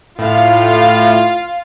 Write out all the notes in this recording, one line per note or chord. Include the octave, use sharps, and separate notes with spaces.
A2 F4 F5